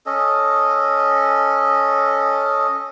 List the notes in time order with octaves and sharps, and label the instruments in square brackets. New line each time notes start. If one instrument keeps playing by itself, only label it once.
[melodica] C#4 A4 D#5